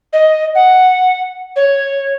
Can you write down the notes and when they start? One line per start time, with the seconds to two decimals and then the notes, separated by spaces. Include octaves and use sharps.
0.12 D#5
0.55 F#5
1.56 C#5